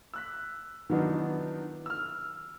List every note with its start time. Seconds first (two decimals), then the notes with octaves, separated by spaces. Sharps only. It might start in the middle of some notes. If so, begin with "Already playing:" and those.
0.14 E6 F#6 B6
0.90 D#3 E3 F#3 B3 D4 D#4
1.86 E6 F6